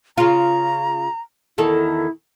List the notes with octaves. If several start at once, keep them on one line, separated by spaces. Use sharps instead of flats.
C#3 F4 A#5
E2 D#3 E4 A4